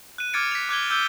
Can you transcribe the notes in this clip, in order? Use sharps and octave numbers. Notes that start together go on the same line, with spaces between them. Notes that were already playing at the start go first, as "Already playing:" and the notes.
F#6 D#7
D6 F6 G#6 A6 C#7 D7
B6 F7
D6 F#6 G#6 G7
D6 E6 G6 D#7 G7